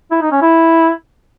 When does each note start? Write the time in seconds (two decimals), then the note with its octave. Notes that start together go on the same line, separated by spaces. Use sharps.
0.11 E4
0.22 D#4
0.32 C#4
0.42 E4